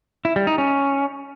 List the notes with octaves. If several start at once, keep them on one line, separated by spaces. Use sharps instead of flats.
E4
G3
D#4
C#4